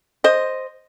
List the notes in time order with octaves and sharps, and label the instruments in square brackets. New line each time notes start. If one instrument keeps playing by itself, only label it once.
[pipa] C5 D#5